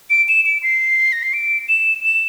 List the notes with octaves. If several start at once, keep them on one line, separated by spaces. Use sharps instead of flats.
D7
E7
D7
C7
A#6
C7
D7
E7
E7